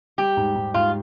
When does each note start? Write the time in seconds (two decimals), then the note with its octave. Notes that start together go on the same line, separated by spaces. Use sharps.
0.18 G3 G4
0.37 G#2
0.55 G#2
0.74 G#2 F4